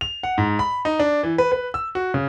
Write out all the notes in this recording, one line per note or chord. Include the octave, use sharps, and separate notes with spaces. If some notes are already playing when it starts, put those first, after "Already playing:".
F7
F#5
G#2
B5
D#4
D4
E3
B4
B4
E6
F#4
C#3